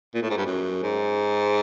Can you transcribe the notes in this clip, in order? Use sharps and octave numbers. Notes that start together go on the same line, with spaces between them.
A#2
A2
G#2
G2
F#2
G#2